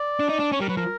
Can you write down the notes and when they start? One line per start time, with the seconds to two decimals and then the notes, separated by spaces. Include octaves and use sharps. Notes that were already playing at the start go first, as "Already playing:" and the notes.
Already playing: D5
0.20 D4
0.29 D#4
0.40 D4
0.52 C#4 C#5
0.60 G3 A#4
0.69 F#3 B4
0.77 F3 A#4